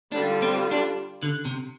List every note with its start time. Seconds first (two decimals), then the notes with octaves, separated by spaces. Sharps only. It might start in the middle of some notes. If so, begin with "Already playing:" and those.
0.12 D3 G3 D4 F4
0.42 C4
0.71 D4
1.23 D3
1.45 C3